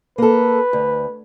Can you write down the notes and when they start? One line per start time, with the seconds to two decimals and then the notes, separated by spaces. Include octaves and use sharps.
0.18 A#3 A4 B4
0.73 D2